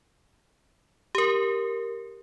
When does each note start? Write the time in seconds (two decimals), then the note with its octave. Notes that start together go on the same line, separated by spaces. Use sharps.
1.15 G4 A#4